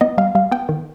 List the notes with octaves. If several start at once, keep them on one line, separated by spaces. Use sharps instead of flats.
B3 D#5
G3 F5
G3 F5
B3 G5
D#3